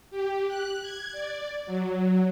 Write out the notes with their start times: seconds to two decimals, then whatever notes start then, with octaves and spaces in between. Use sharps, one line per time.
0.10 G4
0.47 F#6
0.82 G#6
1.12 D5
1.66 F#3